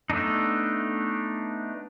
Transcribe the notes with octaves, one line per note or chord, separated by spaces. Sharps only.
A3 B3 D4 D#4